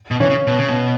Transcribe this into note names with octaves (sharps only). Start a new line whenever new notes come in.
B2
E3 C#4
C#3
B2
C#3
B2